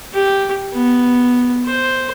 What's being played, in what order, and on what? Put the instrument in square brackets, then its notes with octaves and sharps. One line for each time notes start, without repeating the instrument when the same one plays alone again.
[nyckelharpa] G4
B3
C5